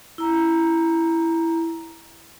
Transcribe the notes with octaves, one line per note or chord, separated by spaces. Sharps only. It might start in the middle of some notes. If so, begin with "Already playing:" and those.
E4 A#5